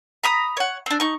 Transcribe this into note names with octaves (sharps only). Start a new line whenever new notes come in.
A#5 B5 D#6
C#5 F#5
C4 D4
D#4 C#6